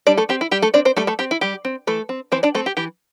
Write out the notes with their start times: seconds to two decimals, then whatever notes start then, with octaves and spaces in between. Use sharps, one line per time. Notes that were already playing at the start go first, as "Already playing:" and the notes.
0.07 G3 D4 D5
0.17 A3 A4
0.29 C4 G4
0.41 E4
0.51 G3 G4
0.62 A3 A4
0.74 C4 D4 D5
0.85 C4 C5
0.96 G3 A3 A4
1.07 A3 A4
1.19 C4 G4
1.31 E4
1.41 G3 G4
1.65 C4
1.87 E3 A3 A4
2.09 C4
2.32 E3 C4 C5
2.43 D4 D5
2.55 A3 C4 A4
2.66 G4
2.77 E3 G4